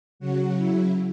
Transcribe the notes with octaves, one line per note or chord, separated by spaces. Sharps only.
C#3 F#3 F#4
E4